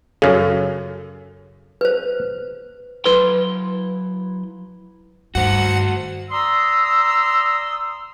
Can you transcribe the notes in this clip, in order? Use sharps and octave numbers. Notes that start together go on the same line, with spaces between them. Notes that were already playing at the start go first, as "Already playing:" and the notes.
F#2 C#3 A4
B4 C5
F#3 E4 B4 C6
G2 F#4 C5 F#5
D5 A#5 C6 D#6 E6